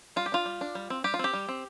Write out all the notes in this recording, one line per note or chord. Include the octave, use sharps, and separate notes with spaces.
G3 F4
G4
D4 F4
G3
D4
G3
C4
G3 G4
F4
C4 G4
G3
C4